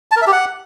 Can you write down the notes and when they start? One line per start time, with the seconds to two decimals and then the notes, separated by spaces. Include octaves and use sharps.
0.11 A5
0.17 A#4
0.22 E5
0.27 G4
0.32 F#5